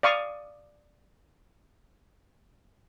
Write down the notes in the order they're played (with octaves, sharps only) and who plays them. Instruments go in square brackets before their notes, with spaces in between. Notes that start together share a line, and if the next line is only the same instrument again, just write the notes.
[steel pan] D5 F5 C#6 D#6